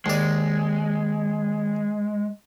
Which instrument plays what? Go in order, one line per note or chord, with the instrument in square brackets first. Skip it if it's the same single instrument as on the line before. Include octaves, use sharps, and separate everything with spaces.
[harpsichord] D#2 D5 [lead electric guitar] G#3